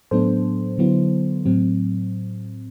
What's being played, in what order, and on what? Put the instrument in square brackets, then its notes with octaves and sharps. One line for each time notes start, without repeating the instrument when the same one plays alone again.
[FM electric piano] A2 F#3 B3 D4 A4 C5
D3 F#3 B3 E4
A2 F#3 C4